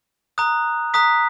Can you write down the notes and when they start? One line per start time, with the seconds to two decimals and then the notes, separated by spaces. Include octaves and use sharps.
0.38 A#5 D#6 F#6
0.94 A#5 D#6 F#6 B6